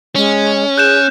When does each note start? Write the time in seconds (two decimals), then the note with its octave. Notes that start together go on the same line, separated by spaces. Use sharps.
0.16 G#3 C#4
0.78 G#4 F#6 G6 E7